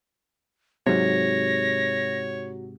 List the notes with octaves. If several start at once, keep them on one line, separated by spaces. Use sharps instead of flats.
G#2 C3 F#3 C#5 A#6